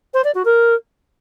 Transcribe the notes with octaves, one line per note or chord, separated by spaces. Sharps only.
C5
D5
F#4
A#4